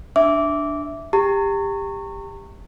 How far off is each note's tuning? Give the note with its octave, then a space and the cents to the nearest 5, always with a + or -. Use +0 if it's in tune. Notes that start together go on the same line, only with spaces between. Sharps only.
D4 +0 E5 +0 D6 -15
G4 +20 A#5 -40